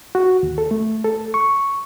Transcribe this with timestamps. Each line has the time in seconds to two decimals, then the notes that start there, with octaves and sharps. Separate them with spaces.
0.15 F#4
0.43 D#2
0.58 A4
0.71 A3
1.04 A4
1.34 C#6